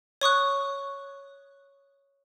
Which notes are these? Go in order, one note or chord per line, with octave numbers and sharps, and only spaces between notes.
C#5 C#6 D#6 F#6